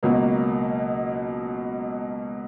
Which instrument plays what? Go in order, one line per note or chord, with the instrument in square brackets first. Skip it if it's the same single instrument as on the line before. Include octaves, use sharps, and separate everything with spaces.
[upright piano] C#2 B2 F#3 A#3